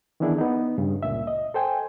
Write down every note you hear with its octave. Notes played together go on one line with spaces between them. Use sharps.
D#3 E3 B3 D4 E4 G#4
B3 D#4
G2 C#3
C#2 A#2 E5
D#5
A4 C5 G5 G#5